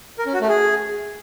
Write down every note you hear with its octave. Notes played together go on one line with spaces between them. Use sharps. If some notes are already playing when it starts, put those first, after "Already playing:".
A#4
C#4
F#4
A3
G#4